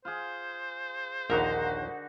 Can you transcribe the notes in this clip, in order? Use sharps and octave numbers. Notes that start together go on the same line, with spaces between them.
F4 G#4 C5
A#1 D#2 D3 D#4 F#4 A#4